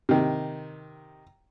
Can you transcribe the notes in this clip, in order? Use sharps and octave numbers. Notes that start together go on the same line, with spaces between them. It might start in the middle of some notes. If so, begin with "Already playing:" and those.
C3 D#3